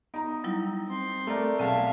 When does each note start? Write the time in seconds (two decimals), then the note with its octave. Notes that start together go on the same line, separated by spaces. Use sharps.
0.14 B3 D#4 A#5
0.44 F#3 G3 E4
0.87 C4 C6
1.27 A3 A#4 D5
1.59 B1 C4 G#4 E5 F5 A5